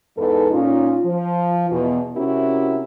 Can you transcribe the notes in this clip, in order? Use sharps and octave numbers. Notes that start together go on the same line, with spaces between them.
E2 G#2 E3 D#4 A4 B4
A#2 C#4 D#4 F4
F3
E2 B2
C3 C4 C#4 E4 F#4 A#4